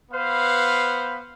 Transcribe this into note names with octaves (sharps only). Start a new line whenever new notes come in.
B3 B4 C5 F5